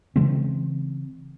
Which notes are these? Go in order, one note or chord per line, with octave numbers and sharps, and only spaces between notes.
C#3 E3 G#3 C4